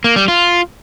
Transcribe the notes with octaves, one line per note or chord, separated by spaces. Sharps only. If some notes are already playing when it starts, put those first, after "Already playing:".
A#3
G3
F4